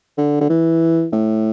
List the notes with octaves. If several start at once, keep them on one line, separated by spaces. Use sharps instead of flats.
D3
D3
E3
A2